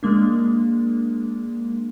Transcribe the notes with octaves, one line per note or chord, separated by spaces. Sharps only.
G#3 A#3 D4